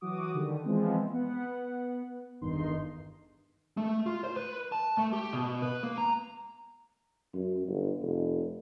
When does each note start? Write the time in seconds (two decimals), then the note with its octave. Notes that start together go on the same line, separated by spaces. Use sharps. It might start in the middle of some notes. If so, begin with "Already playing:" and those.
0.01 E3 F#3 F#4 D6 D#6
0.34 D3 D#3 G3
0.65 E3 F3 G#3 B3 C4
1.12 B3 F#5
2.41 G1 E2 G2 D#3 D#4 C6
3.77 A3
4.06 F4
4.24 C5
4.37 B4
4.72 A5
4.98 A3
5.13 G4
5.33 B2
5.62 B4
5.83 A#3
5.98 A#5
7.34 F#2
7.68 G1
8.02 F1